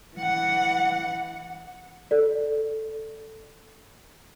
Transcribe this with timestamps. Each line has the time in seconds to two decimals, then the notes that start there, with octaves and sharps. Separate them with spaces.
0.16 E3 F#5
2.11 A4 D5